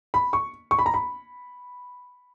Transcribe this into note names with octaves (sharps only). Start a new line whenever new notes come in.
B5
C#6
C#6
B5
A#5
B5